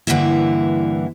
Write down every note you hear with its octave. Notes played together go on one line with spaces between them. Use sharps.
G2 D3 E3 A#3 E4